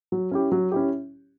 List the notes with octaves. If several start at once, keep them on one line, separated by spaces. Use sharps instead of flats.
F#3
C#4 E4 G4
F#3
C#4 E4 G4